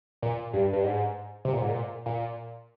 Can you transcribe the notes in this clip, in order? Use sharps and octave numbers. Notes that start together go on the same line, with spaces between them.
A#2
G2
G2
G#2
C3
A#2
G#2
A#2
A#2